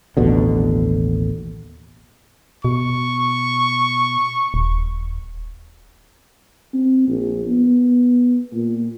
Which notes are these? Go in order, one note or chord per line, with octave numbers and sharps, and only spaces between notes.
A1 D#2 B2 D3
B2 C#6
D#1
C4
A#1
B3
A#2